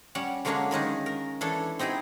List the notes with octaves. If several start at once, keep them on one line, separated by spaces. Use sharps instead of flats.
G3 C#4 F#5
D3 F#3 G#3 A#3 C#4 D4
D#3 G#3 C#4 D#4
A#4
E3 D4 A4 C#5
C4 D#4 E4 G4 G#4